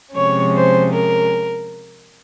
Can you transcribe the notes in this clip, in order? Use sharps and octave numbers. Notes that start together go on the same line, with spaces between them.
C3 F3 G#3 C#4 C#5
C5
A#4